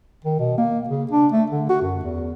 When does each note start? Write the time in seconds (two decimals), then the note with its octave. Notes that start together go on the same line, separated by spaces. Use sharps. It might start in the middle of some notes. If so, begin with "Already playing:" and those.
0.24 D#3
0.39 B2
0.58 A#3
0.88 C#3
1.11 D4
1.32 A3
1.50 D3
1.69 F#4
1.82 F#2
2.03 E2